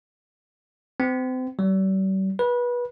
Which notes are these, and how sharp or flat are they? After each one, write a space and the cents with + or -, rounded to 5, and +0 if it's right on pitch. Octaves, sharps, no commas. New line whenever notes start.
C4 -35
G3 -40
B4 -25